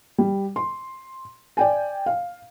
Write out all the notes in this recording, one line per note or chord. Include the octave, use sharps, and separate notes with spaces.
G3
C6
D5 G5 G#5
F5